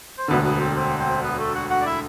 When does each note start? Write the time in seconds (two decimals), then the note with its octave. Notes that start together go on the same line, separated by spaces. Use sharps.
0.18 C5
0.28 E1 D2 D3 B3 B4
0.44 B3 B4
0.60 C4 C5
0.76 C4 C5
0.99 C4 C5
1.23 B3 B4
1.38 A3 A4
1.55 F#4 F#5
1.70 F#4 F#5
1.81 D5
1.85 E4 E5